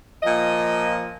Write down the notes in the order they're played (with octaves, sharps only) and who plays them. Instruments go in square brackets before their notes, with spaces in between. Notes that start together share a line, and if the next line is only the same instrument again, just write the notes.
[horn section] A#2 F3 D#5